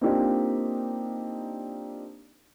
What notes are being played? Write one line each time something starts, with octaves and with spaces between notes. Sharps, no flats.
A#3 C4 D4 D#4 F4 G4